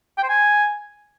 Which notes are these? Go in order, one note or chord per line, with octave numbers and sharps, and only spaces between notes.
G5
C5
G#5